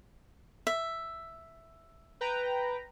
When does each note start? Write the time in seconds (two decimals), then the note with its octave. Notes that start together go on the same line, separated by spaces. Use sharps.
0.67 E5
2.21 B4 G5 A#5